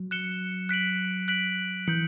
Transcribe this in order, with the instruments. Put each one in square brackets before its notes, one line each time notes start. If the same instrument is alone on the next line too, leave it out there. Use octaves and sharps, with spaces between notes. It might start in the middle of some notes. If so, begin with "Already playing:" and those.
Already playing: [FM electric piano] F#3
[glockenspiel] F#6 C#7 E7 G7
F#6 B6 D7 F#7
F#6 B6 D7 F#7
[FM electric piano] E3 [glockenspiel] G6 C#7 F#7